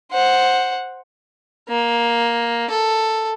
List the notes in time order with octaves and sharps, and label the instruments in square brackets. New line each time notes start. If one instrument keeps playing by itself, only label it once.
[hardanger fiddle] C5 F#5
A#3
A4